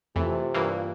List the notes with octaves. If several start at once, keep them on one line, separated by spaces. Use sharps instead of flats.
F2 C3 E3 A3 F4
G2 E3 A#3 F4